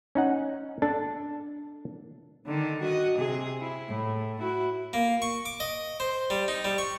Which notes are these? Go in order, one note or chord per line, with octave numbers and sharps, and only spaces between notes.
C#4 D#4 F#5
D4 A4 A5
D3 D#3
F#4 D#5
C3 G#4
E4
A2
E4 F#4
A#3
C#6
D6
D#5
C5
G3
D#4
G3
C#6